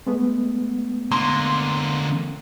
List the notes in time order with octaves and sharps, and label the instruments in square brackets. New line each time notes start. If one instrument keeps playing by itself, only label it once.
[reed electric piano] G#3 A3 B3
[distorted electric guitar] D3 A#3 [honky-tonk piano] C6